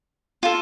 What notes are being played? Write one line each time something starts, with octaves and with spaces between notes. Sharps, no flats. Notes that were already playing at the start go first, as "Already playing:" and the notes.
F4 A4